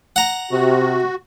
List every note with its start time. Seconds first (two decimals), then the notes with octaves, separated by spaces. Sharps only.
0.16 F#5 A#5
0.51 C3 F#4